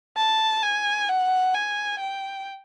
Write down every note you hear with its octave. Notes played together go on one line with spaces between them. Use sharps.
A5
G#5
F#5
G#5
G5